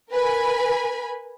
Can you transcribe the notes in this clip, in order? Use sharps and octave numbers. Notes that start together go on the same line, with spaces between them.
A#4 B4 G#5 B5